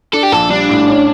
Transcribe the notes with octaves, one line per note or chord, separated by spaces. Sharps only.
D4 A4
G4
A#1 A4
G3 D4
A2
C#4